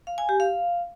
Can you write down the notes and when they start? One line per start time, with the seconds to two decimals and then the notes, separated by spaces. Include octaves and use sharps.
0.07 F5
0.18 G#5
0.29 G4
0.40 F5